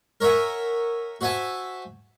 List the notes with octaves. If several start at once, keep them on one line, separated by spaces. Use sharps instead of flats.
A#4 C#5 E5 F#5 G#5
F#4 C5 E5 G#5 A5